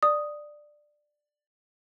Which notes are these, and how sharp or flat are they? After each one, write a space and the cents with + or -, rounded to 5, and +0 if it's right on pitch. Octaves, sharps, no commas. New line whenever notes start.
D5 +15 D#6 +0